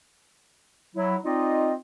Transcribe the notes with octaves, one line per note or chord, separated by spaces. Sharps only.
F#3 E4
C4 D#4 F4 D5 D#5